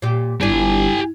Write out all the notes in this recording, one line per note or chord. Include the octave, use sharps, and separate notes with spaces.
A#2 G4
G1 G3 D4 E4 G4 G#5